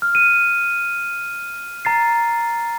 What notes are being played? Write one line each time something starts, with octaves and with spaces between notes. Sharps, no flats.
F6
D#7
A#5 A6 C7